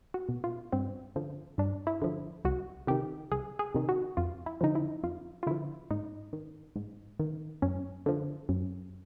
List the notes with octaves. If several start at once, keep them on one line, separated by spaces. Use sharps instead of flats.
F#4
B2
F4
G2 C4
D3 F3
G2 D4
E4
D3 F3
C2 F#4
C3 D#3 G4
C2 G#4
G#4
C3 D#3
F#4
F2 F4
E4
D3 F3 D#4
E4
F2 F4
F4
D3 F3 E4
G#2 D#4
D#3
G#2
D#3
F#2 C#4
D3 F3
F#2